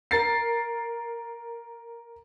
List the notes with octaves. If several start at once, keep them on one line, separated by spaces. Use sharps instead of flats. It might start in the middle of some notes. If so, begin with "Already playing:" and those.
A#4 A6 C7